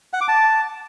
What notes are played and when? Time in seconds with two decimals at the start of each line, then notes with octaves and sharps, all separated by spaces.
0.13 F#5
0.21 D6
0.28 A5